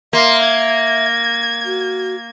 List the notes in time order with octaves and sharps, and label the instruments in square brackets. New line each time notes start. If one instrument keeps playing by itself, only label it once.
[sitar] A#3 [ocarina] E5 [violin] C6
[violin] G#6
[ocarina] F#4